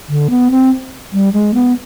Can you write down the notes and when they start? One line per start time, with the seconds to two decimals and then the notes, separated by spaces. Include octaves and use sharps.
0.09 D3
0.30 B3
0.51 C4
1.13 G3
1.33 G#3
1.54 B3